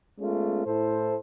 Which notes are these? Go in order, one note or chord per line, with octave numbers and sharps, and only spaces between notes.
G#3 A3 B3 C#4 F4
A2 E4 A4 C5